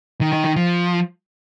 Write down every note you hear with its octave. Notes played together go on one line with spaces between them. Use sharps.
D#3
D#3
D#3
F3